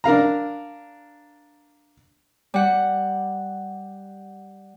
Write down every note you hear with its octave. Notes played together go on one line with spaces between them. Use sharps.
D4 A#4 F5 A#5
G3 F#5